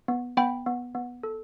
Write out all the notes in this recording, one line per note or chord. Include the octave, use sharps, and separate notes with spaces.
B3
B3 G5 B5
B3
B3
A4